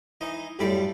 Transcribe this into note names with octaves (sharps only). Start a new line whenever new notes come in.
E3 D#4 D#5
B1 F#2 A2 G3 D5 B5